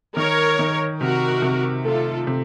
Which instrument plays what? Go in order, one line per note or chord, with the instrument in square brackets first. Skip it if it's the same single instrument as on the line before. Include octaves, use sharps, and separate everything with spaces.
[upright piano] D#3 [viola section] A#4 C#5
[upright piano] D#3
[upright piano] C3 [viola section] F#4 A#4
[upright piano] C3
[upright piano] A3 [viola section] F4 A4
[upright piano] C3